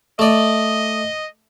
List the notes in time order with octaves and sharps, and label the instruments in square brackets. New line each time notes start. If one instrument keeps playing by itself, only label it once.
[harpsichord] A3 D5 [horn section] D#5